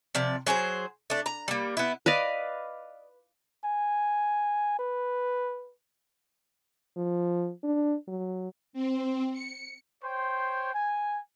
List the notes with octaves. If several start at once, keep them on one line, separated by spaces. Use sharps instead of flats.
C3 F3 D5
F#3 G#4 A4 C5
A3 D4
A#5
G3 A#3
B3 E4
B4 D5 D#5 F5
G#5
B4
F3
D4
F#3
C4
C#7
C5 C#5 G5 C6
G#5